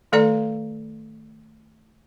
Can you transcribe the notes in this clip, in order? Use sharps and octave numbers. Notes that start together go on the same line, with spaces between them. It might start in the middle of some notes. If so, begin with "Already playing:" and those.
D#3 A3 A4 D5 F5 A#5